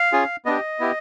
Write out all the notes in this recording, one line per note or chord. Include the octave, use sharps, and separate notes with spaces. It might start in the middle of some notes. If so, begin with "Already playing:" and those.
Already playing: F5
C#4 F4 G#4
B3 D4 G4 D#5
B3 E4 G4